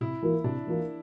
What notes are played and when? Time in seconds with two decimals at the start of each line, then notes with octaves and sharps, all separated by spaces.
0.01 C3 E4
0.22 E3 A#3 F4 A#4
0.44 C3 D4
0.67 E3 A#3 F4 A#4